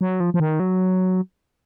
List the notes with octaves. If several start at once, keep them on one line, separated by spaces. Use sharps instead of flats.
F#3
F3
F3
D#3
F#3